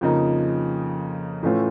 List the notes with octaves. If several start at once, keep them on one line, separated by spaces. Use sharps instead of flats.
F2 C#3 F3 A#3 D#4
A2 E3 A3 C#4 F4